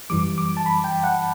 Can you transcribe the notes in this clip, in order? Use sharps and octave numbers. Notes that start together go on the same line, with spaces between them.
F#2 E3 G3 D6
D6
A5
B5
G5
F#5